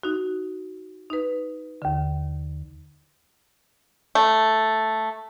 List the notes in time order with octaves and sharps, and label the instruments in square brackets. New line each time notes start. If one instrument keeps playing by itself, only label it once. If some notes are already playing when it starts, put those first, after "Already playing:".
[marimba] D#4 F#4
D#4 B4
D#2 D3
[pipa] A3